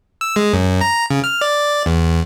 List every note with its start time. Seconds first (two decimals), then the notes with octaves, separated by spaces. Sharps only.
0.21 E6
0.36 G#3
0.53 F#2
0.81 A#5
1.11 C#3
1.24 F6
1.41 D5
1.86 E2